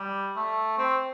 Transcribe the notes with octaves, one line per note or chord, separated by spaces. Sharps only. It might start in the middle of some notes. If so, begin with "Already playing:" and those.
Already playing: G3
A3
C4